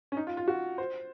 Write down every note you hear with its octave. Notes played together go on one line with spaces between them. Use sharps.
C#4
D#4
F4
F4
F#4
C5